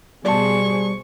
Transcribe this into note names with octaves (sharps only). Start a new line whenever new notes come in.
B2 G3 G#4 C5 D5 A5 C#6